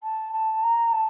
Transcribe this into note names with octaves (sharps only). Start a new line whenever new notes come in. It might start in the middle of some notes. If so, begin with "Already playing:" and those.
A5
A5
A#5
A5